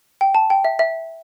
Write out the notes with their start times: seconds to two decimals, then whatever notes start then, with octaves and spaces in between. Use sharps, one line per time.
0.21 G5
0.35 A5
0.50 G5
0.65 E5
0.79 E5